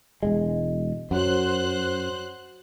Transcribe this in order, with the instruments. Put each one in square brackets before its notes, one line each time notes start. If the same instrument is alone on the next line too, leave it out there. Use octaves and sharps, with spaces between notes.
[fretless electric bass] E1 G#3 [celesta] D#5
[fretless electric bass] F#2 [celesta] F#4 C#5 F#5 [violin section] C5 F#6